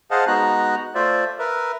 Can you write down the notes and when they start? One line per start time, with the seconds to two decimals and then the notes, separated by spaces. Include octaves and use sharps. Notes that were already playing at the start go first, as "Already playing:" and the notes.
0.11 G#4 C5 D#5 F5 F#5 A5
0.27 G#3 B3 D#4 F#4 A#5 F#6
0.95 A3 F4 C5 D5 E5
1.39 A#4 B4 E5